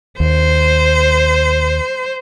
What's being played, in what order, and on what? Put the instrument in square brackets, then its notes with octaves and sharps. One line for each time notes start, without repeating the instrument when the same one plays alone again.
[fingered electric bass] D#2 [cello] C5